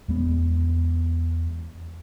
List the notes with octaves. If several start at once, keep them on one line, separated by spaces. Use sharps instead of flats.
E2 G#3 B3